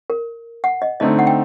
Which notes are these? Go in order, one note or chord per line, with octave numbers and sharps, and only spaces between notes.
A#4
F#5
D#5
D3 A3 C4 D#4 D#5
F#5
G5